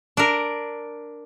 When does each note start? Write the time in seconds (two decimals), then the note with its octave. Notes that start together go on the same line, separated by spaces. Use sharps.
0.17 D4 A#4